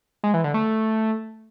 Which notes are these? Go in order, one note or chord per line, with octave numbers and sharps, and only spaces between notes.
G#3
E3
D3
A3